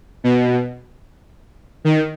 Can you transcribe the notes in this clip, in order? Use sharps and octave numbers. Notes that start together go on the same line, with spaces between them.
B2
D#3